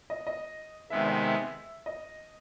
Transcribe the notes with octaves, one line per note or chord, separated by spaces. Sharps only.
D#5
D#5
C3 D#3 G#3 B3 E5
D#5
E5
D#5